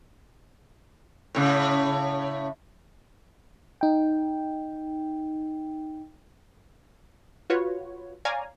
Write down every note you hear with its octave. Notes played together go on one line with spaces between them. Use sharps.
A2 C#3
D#4 G5
F4 F#4 B4 C#5
C#5 D5 F5 G#5 A#5